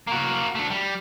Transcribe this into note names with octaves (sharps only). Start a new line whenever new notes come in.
A#3 F#4
A3 D4
G3